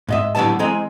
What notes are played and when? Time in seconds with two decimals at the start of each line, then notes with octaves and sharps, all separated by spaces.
0.09 G#2 D#5 E5
0.35 A2 D3 F#3 G3 B3 A5
0.59 E3 G#3 C4 G#4 D#5 A#5